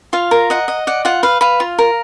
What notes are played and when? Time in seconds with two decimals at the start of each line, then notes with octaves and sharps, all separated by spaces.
0.13 F4 F5
0.31 A#4
0.50 D#5 F#5
0.68 D#5
0.87 D5 F#5
1.05 F4 F#5
1.23 B4 F5
1.41 B4 F5
1.60 F4
1.79 A#4